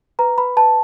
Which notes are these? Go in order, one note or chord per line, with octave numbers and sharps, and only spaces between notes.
B4 A#5
B4 B5
B4 A5